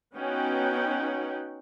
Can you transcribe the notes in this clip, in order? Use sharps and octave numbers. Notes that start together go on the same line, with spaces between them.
B3 C#4 D#4 F#4 F#5 G5